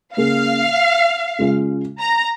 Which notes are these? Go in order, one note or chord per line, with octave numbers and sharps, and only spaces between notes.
C#3 A#3 C#4 G#4 F5
C#3 G#3 F4 G#4
A#5